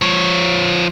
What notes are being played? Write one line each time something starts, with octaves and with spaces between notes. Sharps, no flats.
F3 C#5